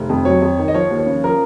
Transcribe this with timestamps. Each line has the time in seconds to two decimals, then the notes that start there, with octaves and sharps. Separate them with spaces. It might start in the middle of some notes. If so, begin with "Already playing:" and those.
Already playing: F1
0.10 F2
0.25 F#3 C#5
0.42 F2
0.58 D#3
0.68 D#5
0.74 F3 C#5
0.91 D#2
0.99 C#5
1.07 C#3
1.24 F3 A#4